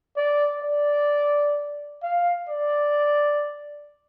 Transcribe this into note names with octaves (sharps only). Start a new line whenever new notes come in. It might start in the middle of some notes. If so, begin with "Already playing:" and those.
D5
D5
F5
D5